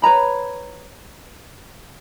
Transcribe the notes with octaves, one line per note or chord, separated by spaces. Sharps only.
B4 C#5 A#5 B5